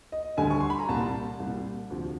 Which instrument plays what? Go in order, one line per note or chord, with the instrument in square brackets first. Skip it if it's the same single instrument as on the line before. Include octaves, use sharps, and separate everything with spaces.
[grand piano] D#5
D2 D3 G3 G#5
C#6
C6
B5
A#5
C2 A#2 G3 A5
C2 A#2 G3
D2 C3 F3